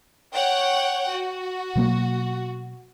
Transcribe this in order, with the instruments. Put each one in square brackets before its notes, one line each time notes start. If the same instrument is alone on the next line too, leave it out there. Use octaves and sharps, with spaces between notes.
[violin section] C#5 F#5 G5
F#4
[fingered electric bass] B2 F#3 A#3